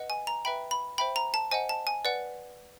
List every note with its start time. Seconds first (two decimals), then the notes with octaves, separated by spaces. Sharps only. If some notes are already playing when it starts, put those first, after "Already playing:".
Already playing: B4 D#5 F#5
0.10 G#5
0.27 A#5
0.45 B4 E5 G5 B5
0.71 B5
0.98 C5 E5 G5 B5
1.16 A#5
1.34 A5
1.51 C5 D#5 F#5 G#5
1.69 A5
1.87 G#5
2.05 B4 D5 F#5